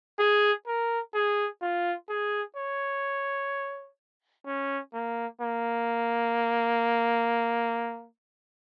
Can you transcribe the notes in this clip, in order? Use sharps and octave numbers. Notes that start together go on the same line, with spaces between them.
G#4
A#4
G#4
F4
G#4
C#5
C#4
A#3
A#3